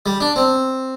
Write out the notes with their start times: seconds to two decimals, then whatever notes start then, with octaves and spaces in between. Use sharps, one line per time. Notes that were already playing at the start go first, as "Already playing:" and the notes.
0.06 G3
0.20 D4
0.36 C4